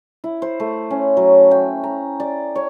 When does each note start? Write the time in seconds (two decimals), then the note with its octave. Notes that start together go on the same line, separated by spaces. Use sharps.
0.24 E4
0.42 C5
0.60 A3
0.90 C#4
1.17 F#3
1.51 G5
1.83 A#5
2.20 D5
2.55 C#5